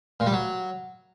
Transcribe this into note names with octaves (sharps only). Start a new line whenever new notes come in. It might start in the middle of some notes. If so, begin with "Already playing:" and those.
A#2
G3
F#3